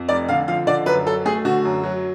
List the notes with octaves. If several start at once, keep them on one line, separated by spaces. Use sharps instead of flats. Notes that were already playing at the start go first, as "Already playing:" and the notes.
Already playing: F2
F1 D5
D3 F5
F3 F5
D3 D5
F#2 B4
F#3 A4
A3 G#4
D3 F#4
F#2
F#3